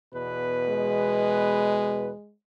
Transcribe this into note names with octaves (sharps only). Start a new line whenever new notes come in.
E2 B2 B4
G#3